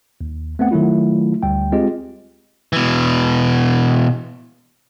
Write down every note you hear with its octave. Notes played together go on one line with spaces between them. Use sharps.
D#2
A3 B3 C4 F#5
D#3 F#3 A3 E4 F4
D2 G3 G5
G#3 C4 F4 G4 G#4 D#5
B2 E3